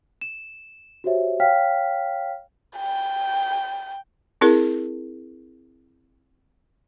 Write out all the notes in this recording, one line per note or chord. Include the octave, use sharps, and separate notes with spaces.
E7
F#4 G4 C5 C#5 E5
C#5 F5 G5 F6 B6
G5
C4 E4 G#4 A#4